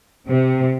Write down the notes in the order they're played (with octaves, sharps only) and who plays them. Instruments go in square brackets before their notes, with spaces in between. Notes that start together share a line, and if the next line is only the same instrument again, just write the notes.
[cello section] C3